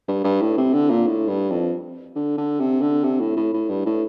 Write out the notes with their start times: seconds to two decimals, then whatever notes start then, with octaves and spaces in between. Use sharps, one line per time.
0.08 G2
0.24 G2
0.41 A2
0.57 C3
0.74 D3
0.90 A#2
1.07 A2
1.28 G2
1.51 F2
2.16 D3
2.38 D3
2.60 C3
2.81 D3
3.04 C3
3.20 A2
3.37 A2
3.54 A2
3.70 G2
3.86 A2